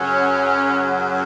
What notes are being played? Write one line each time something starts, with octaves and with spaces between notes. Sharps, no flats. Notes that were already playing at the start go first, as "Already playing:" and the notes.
Already playing: F#2 C#3 F#3 C#4